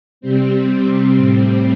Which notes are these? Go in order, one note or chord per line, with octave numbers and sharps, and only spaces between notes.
C3 G3 C4
A2 G3 C4